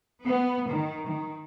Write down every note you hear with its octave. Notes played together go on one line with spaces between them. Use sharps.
B3
D#3
D#3